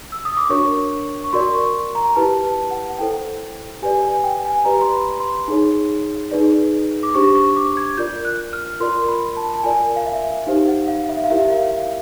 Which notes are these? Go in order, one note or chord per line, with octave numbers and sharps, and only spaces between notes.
E6
D#6
D6
D4 F#4 A#4 C#5 C#6
C#6
F#4 A#4 D5 C6
C#6
A#5
E4 G4 B4 A5
A5
F#5
E4 A4 C5 G5
G4 B4 D5 G#5
G#5
G5
G#5
G4 B4 D5 A#5
C6
B5
C6
D#4 G#4 C#5
D#4 G#4 B4 D5
D6
D4 G4 C5 C#6
C#6
D6
G#6
F4 A#4 D5 G6
F#6
F6
F4 A#4 D5 C6
B5
A5
A5
F4 A#4 D5 G#5
F5
E5
D#4 G4 C5 F5
F#5
F5
E5
F5
E4 G4 A#4 E5
F5
F5